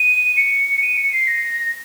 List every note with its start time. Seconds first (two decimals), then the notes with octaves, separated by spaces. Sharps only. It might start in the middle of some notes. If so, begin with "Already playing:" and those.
Already playing: D#7
0.37 C#7
0.82 D#7
0.97 C#7
1.13 C7
1.27 A#6